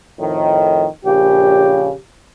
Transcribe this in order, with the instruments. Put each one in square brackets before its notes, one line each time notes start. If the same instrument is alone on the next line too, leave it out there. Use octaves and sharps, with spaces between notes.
[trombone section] F2 A2 D#3
[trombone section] A#1 C#3 [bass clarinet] G4